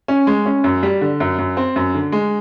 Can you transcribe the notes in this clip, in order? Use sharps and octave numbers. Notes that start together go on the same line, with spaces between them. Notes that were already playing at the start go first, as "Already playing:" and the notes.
C#4
G#3
C#4
F#2
G3
D3
F#2
F#2
C4
F#2
D3
G#3